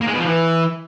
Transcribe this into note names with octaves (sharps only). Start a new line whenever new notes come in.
A#3
G#3
B2
F3
E3